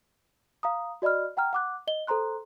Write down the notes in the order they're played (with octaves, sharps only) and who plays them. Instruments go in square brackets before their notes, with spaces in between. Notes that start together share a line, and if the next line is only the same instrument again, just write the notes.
[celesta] F5 A#5 D#6
F#4 D5 D#5 B5 F6
F#5 G5 A#5 F6
F#5 D6 F#6
D#5 G7
A4 C5 A#5 C6 F#6